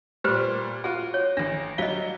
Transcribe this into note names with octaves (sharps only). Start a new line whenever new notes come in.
A#2 G3 G4 B4 C5
F4 F#4 G#4
C#5
A1 D4 A#6
F#3 G3 D#5 F5 G7